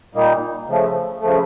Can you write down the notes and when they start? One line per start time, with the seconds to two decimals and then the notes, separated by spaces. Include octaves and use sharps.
0.15 A#2 G3 A#3 D#4
0.68 C#3 F3 A3
1.20 C#3 F3 A3